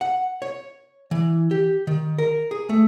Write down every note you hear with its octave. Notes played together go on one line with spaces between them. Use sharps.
F#5
C#5
E3
G4
D#3
A#4
G#4
A3